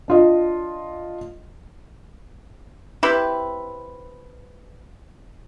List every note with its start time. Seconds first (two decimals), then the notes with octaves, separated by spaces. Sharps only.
0.08 D4 F4 D#5
3.03 C4 E4 G4 B4